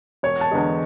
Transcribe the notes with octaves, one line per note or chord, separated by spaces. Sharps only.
E1 C#5
A5
E2 D3 G#3